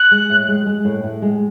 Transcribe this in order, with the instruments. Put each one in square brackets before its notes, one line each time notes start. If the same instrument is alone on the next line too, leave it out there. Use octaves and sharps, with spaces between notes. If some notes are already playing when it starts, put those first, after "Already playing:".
Already playing: [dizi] F#6
[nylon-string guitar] G#3
A2
G#3
G#3
A2
A2
G#3